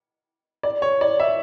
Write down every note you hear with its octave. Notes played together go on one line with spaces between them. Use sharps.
D5
C#5
D5
E5